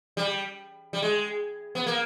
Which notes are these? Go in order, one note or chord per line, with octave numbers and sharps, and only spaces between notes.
G3
G3
G#3
B3
A#3